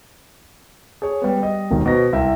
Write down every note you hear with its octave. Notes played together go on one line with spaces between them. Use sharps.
G#4 C#5
G3 B3
G3 D#5
F1 B1 D#3
B2 C5 A#6
C2 E5 G5